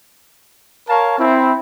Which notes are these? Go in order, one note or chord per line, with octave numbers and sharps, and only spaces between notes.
A#4 C#5 F5 A5
C4 E4